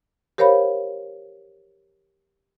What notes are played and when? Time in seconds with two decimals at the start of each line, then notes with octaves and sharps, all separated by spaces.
0.38 G4 A#4 C5 C#5 F5 B5